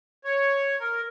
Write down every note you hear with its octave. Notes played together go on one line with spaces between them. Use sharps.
C#5
A#4